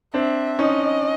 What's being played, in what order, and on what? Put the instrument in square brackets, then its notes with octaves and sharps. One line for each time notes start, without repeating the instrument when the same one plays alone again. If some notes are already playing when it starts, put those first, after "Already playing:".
[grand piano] C4 D4 [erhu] E5
[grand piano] C#4 D#4 [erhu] D#5